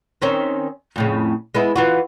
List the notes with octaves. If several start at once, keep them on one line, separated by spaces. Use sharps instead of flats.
D#3 C4 C#4
F2 A2 C#3
G#3 B3 E4
E3 F4 F#4